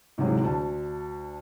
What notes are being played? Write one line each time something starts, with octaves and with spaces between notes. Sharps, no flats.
G#2 C3 E3 F#3 G#3
D2 A5